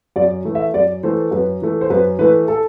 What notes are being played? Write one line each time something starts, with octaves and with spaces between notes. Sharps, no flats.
F#2 D5
E3 A3
E5
F#2 D5
E3 A3 C5
F#2 B4
E3 A3
C5
F#2 B4
E3 A3 B4
A4